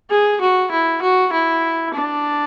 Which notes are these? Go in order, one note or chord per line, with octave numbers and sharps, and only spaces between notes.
G#4
F#4
E4
F#4
E4
D4